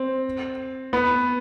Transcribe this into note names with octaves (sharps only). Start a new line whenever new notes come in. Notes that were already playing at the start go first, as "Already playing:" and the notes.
Already playing: C4
B3